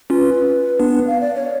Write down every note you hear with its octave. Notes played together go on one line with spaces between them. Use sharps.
C#4 F4 B4
B3 D4
F5
D5
C#5